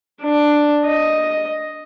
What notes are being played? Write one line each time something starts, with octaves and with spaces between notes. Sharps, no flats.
D4
D#5